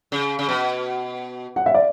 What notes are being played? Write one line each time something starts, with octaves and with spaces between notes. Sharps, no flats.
C#3
C#3
B2
F#5
E5
D5